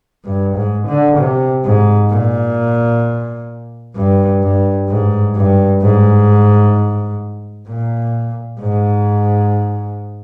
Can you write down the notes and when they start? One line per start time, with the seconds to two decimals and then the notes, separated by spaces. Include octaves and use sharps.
0.24 G2
0.56 G#2
0.87 D3
1.17 C3
1.64 G#2
2.10 A#2
3.95 G2
4.42 G2
4.88 G#2
5.35 G2
5.81 G#2
7.67 A#2
8.60 G#2